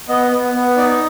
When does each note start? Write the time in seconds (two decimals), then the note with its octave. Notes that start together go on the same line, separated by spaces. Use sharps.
0.09 B3 D#5
0.32 B3
0.54 B3
0.77 D#4 D5